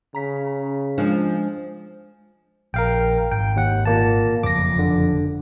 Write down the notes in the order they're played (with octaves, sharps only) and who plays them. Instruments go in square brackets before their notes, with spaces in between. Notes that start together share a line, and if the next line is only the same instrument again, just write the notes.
[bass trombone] C#3 [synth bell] A#5 B6
[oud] F3 [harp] G#3 [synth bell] D4
[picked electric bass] A#1 [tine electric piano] A#4 F5 G5
[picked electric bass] G#1 [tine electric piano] G5
[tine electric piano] D#2 F#5
A#2 A#3 A5
[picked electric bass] F#1 F2 F3 [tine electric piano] D6 A#6
[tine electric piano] D3